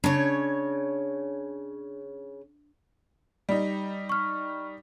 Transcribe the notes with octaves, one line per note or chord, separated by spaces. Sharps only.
C#3 D4 C#5
G3 D#4
C#6 F6